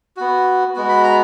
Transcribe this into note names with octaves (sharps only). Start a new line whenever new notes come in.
B3 F#4
G#3 B3 F#4
B5
A#5